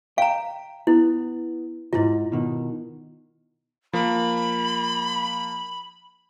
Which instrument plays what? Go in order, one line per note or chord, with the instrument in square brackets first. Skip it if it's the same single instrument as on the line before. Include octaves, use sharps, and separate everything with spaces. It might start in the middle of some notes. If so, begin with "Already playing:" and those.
[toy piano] F5 A#5 [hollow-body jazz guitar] G5
[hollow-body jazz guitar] B3 [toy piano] E4
[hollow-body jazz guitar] D2 G#2 [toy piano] E4 F4
[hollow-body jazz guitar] B2 D#3
[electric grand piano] F3 A#3 [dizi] B5